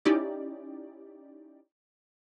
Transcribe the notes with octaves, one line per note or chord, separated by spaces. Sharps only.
C#4 D#4 E4 G4 D5